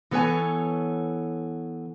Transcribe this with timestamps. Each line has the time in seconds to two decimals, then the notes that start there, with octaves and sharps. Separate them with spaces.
0.11 E3 B3 A4 C#5 G#5